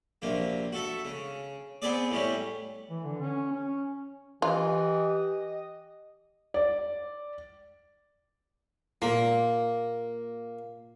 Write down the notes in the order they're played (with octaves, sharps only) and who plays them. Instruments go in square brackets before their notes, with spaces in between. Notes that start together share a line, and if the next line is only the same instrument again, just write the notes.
[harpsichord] A#1 C3 A#3
F#4 A4 E5
C#3
B3 C4 G#4 D5
A2 G3 C#4
[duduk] E3
D3
C#4
C#4
[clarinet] E3 [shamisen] F4 [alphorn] G4 [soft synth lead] D#5
[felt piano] D5
[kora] A#2 D5 [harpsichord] A#3